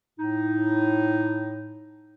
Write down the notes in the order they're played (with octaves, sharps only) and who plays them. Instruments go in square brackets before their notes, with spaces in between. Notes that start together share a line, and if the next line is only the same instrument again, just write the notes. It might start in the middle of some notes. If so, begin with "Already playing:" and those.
[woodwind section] A2 D#4